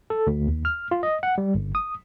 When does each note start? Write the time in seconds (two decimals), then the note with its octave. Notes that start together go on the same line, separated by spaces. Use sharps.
0.10 A4
0.27 D2
0.48 D#2
0.65 F6
0.91 F4
1.03 D#5
1.23 F#5
1.38 G3
1.55 G1
1.75 D#6